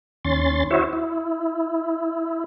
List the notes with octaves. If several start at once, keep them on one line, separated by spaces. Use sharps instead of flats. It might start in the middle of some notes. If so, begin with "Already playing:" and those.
D#2 C#4 C6 A6
E4 F#4 C5 C#5 E5
E4